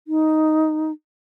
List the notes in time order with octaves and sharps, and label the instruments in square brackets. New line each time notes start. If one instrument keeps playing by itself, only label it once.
[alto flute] D#4